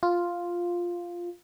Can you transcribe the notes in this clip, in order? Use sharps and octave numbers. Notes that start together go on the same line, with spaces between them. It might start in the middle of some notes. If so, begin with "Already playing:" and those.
F4